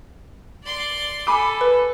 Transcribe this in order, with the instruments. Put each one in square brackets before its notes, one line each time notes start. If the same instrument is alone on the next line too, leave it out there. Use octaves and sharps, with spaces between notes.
[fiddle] D5 C6
[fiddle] A4 [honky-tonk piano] G#5 B5 D6
[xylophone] B4